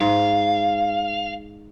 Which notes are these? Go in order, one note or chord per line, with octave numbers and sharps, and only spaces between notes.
G#2 F5